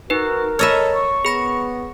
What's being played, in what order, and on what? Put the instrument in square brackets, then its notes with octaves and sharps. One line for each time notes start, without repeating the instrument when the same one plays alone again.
[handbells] D#4 B4 [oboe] F#4 [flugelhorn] A#4
[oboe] A4 [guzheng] C#5 D#5 E5 [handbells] B5 F6
[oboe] C#6
[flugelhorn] B3 [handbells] G#4 B5 A#6